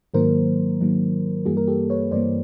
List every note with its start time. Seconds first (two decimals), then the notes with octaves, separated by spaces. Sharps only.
0.14 G#2 D#3 F#3 A#3 A#4 C5
0.81 G#2 D#3 F#3 A#3
1.45 G2 E3 G3 A#3 F#4 G#4
1.57 A#4
1.67 G4 A4
1.90 B4 C#5
2.12 G2 E3 G3 A#3 C5 D5